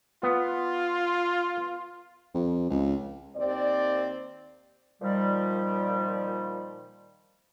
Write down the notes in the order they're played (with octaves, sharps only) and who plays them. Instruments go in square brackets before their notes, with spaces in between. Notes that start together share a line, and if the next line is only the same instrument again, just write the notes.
[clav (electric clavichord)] B3 [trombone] F4
[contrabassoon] F2
C#2
[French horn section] D#2 C4 C5 D5
[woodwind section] A#2 D#3 F3 G3